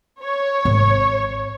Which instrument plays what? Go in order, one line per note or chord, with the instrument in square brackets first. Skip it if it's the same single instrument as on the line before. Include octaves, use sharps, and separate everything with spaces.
[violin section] C#5
[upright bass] G#1